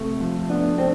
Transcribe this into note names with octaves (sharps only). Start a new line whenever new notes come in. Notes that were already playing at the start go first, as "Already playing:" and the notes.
Already playing: C3 A3
F3
B3 D4
C4 D4